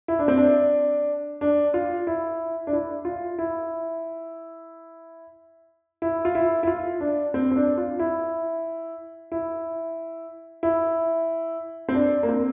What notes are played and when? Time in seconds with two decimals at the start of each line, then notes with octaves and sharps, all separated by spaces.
0.08 E4
0.19 D4
0.28 C4
0.38 D4
1.41 D4
1.74 F4
2.07 E4
2.67 D4
2.73 E4
3.05 F4
3.38 E4
6.02 E4
6.25 F4
6.35 E4
6.63 E4
6.67 F4
7.00 D4
7.34 C4
7.51 C4
7.56 D4
7.78 F4
7.99 E4
9.32 E4
10.63 E4
11.89 C4
11.95 D4
12.23 A#3
12.29 C4